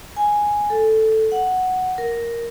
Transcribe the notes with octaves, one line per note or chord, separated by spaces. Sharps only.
G#5
A4
F#5
A#4